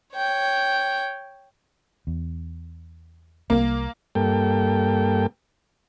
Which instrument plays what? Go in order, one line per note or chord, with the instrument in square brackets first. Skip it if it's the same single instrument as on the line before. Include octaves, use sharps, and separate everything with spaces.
[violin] C#5 G5
[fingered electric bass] E2
[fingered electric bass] C2 F3 G3 [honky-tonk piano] A#3
[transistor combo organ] G2 A#3 A4 G5